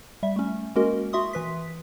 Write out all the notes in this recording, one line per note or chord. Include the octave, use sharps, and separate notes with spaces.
G3 E5
A3 C#4
G#3 A#3 C#4 F#4 A#4 D#5
F#4 E5 C6 D#6
E3 B4 B6